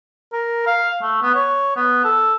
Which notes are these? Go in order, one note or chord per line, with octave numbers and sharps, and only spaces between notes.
A#4
F5
A3
B3
C#5
B3
A4